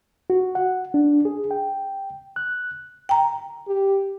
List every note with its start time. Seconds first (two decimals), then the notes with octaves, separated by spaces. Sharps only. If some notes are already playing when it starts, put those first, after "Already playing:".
0.30 F#4
0.55 F#5
0.94 D4
1.25 G#4
1.51 G5
2.36 F#6
3.09 G5 A#5
3.67 G4